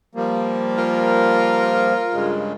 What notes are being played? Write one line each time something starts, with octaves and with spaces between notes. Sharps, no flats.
F3 G3 A#3
F4 A#4
G2 C#3 G#3